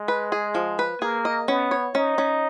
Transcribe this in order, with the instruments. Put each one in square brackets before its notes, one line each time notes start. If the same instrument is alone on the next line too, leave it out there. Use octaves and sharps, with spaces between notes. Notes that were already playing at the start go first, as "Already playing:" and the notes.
Already playing: [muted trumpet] G#3
[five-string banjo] B4
G#4
F3
B4
[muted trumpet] A#3 [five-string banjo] G#4
[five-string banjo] D#5
[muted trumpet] B3 [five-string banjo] C#4
[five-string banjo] C#5
[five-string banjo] C#4 [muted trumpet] D#4
[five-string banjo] C#4